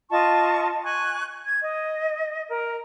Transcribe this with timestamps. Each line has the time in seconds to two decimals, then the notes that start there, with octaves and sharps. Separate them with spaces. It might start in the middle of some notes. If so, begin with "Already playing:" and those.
0.10 F4 D#5 A5 C#6
0.84 G#5 C#6 F#6
1.46 G#6
1.60 D#5
2.48 A#4